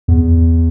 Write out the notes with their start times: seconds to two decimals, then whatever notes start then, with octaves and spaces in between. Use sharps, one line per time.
0.08 E2